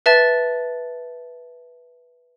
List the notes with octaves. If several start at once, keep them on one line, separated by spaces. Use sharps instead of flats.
B4 E5 A5 A6